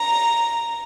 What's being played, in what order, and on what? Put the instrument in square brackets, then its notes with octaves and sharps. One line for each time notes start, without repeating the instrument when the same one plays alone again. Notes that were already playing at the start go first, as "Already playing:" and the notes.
Already playing: [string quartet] A#5